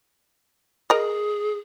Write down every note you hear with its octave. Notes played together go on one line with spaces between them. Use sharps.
G#4 A#4 D#5